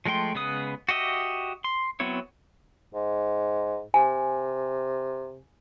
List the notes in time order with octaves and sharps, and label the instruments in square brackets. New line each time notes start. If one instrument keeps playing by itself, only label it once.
[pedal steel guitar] F3 G#3 A3 G5 C6
C#3 G#3 B3 B4 D#6
F#4 G4 D#5 E5
C6
F#3 B3 C4 E4 C#5
[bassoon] G#2
[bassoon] C3 [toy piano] G#5